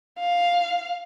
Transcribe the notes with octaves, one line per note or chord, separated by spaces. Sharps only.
F5